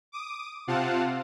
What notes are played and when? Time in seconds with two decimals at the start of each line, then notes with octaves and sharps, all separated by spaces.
0.12 D6 D#6
0.67 C3 C4 F4 F5 F#5 A5